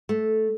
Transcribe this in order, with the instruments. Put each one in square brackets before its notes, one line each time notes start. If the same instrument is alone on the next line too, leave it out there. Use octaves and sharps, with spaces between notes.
[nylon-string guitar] A3